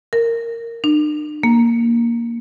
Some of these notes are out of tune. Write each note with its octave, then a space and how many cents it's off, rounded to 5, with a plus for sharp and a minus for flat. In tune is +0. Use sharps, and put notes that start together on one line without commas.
A#4 -10
D4 +45
A#3 +5